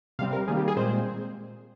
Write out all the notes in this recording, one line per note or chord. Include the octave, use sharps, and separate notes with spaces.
C3 G3 C4 F5
A#4
D#3 G3 A#3 G#4
G4
G#4
A#2 G#3 C4 C5